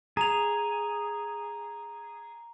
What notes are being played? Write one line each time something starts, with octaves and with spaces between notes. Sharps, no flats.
G#4 A#5 F7